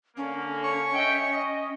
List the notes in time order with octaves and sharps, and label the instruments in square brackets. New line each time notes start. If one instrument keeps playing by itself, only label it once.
[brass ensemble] D3 A#3 [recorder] C#4
[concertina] C#5 C#6
[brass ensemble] D#5 E5 G5
D#5